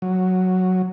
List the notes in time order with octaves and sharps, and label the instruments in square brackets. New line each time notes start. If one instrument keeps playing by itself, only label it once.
[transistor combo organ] F#3